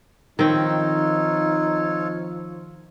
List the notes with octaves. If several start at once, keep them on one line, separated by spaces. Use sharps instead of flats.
D#3 F3 C4 D#4 F4 A4 C#5